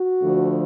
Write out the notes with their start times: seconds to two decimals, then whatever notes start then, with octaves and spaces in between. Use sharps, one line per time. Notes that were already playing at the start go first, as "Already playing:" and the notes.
Already playing: F#4
0.22 D2 D3 F3